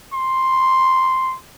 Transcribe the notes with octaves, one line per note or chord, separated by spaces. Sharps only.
C6